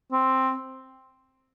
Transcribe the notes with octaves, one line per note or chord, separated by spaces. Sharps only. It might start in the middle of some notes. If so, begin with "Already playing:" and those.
C4